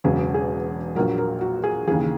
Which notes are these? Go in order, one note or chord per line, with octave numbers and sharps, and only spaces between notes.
E1 E2 C#3 F#3 G#4
G#4
A#1 A#2 F#3 A#4
A#4
F#4
G#4
D#2 C#3 E3 G#4